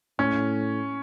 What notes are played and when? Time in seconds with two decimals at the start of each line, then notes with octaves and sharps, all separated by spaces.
0.19 A2 C#4